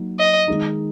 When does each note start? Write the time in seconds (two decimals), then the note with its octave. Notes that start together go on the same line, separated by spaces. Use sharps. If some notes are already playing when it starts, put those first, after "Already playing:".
Already playing: F#3 A#3 D#4
0.19 D#5
0.48 D#3 G#3 D#4